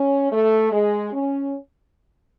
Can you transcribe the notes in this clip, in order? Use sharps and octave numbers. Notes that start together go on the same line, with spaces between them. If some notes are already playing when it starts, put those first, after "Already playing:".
Already playing: C#4
A3
G#3
C#4